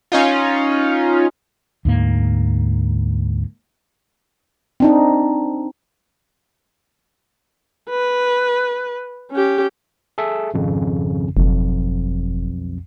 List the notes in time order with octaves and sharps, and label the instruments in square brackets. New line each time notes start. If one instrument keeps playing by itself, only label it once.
[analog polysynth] C#4 D#4 F4
[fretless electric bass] D2 G#2 A#3
[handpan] C4 D4 D#4
[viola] B4
C#4 G4
[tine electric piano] G#4 A4 E5
G#1 F2 C#3
[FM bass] F#1 [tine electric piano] B1 F2